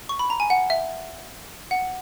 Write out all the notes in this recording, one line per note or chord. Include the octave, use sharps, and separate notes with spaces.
C#6
B5
A#5
G#5
F#5
E5
F#5